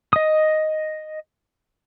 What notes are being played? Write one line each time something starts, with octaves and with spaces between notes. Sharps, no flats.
D#5 D#6